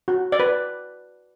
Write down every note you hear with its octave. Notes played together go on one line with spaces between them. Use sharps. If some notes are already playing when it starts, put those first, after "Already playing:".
F#4
D5
B4